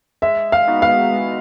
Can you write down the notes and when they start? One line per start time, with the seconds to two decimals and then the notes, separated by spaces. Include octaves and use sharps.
0.22 G#3 E5
0.52 F5
0.68 B3 D#4 F#4
0.82 F5
1.13 G#3